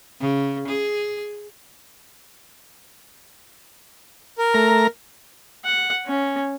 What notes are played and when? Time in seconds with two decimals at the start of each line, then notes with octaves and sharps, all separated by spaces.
0.20 C#3
0.68 G#4
4.39 A#4
4.54 A3 A#5
5.65 F#5
6.07 C#4